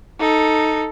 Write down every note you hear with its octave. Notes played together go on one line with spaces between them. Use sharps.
D#4 A4